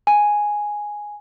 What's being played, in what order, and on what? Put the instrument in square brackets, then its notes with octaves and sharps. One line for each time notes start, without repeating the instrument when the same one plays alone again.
[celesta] G#5